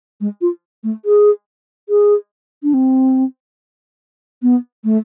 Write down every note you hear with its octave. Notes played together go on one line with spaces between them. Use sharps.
G#3
F4
A3
G#4
G#4
D4
C4
B3
A3